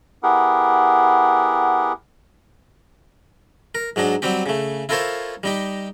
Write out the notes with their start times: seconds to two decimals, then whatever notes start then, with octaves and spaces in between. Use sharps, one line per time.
0.23 B3 E4 G4 G#4 A#4 F#5
3.75 A#4
3.96 G#2 F#3 D4 D#4
4.22 F#3 G3 C4 G4
4.46 C#3 A3
4.89 E4 F4 A4 A#4 C5 C#5
5.43 G3 D#4 G4